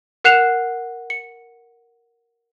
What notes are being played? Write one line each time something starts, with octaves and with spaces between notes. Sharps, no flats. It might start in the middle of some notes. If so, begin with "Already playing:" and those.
A#4 F#5 F#6 C7 E7 F7
C#7